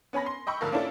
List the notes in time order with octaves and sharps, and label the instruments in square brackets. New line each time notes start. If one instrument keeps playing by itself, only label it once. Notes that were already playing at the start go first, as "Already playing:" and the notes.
[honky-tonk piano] B3 C#4 G#5 B5 A#6
C6
D#5 G5 B5 C#6 E6
D2 G#2 D3 F3 F4 A#4
A#3 C#4 D4 E4 F4 A4